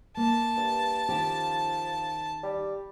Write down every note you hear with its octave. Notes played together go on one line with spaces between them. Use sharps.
A#3 A5
G2
D#3 F3 C#4 G4
G3